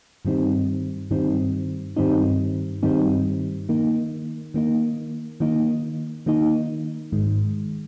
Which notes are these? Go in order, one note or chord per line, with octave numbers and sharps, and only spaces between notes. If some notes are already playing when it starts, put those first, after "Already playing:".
G2 D#3 G3 C4 D#4
G2 D#3 G3 C4 D#4
G2 D#3 G3 C4 D#4
G2 D#3 G3 C4 D#4
D#3 A#3 D#4
D#3 A#3 D#4
D#3 A#3 D#4
D#3 A#3 D#4
G#2 D#3 G#3